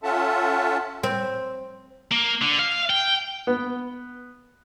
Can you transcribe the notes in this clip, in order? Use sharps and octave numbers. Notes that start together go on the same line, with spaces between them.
C#4 F4 A4 E5 F#5 A5
C4
A#3
D3
F5
G5
B3